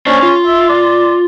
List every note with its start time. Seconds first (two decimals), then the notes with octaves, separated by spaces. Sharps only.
0.07 C#4 D4 C5
0.22 F4
0.47 E5
0.69 D5